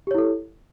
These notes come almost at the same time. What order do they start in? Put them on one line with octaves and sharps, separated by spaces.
G4 C#5 E4 A4